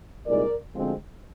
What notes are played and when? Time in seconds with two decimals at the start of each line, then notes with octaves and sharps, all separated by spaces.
0.25 C2 A#2 G#3 D#4 A#4 D5
0.75 D2 D3 F3 G#3 C4